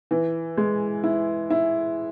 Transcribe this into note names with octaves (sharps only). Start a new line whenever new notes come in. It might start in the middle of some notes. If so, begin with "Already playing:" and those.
E3
G#3
E4
E4